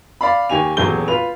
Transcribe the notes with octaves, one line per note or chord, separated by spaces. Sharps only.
D5 F5 B5
D#2 G4 G#5 F7
D#1 E2 F#3 G#4 G6 G7
F4 B4 F7